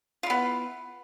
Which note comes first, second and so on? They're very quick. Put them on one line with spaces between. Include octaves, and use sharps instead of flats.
F4 E4 B3